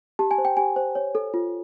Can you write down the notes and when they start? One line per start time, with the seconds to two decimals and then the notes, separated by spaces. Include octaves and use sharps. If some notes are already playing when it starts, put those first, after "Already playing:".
0.19 G4 A5
0.31 G#5
0.38 C5
0.45 G5
0.57 G4 G#5
0.76 C5
0.95 C#5
1.15 A4
1.34 F4